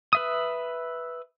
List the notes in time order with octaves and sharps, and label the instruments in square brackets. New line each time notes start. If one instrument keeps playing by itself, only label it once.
[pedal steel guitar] B4 E5 D#6